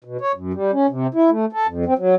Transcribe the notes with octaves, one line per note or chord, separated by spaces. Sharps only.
B2
C#5
F#2
G3
C#4
C3
E4
A3
A4
F2
C4
F#3